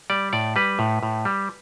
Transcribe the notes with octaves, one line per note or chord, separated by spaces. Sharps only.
G3 D5
A2 D5
G3 B4
A2
A2
G3